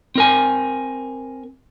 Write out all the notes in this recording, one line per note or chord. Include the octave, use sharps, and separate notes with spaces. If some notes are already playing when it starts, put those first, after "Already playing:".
C4 A#4 G#5